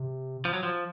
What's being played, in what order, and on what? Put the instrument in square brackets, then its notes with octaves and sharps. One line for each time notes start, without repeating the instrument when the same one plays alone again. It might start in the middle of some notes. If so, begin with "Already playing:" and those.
Already playing: [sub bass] C3
[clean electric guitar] F3
F#3
F3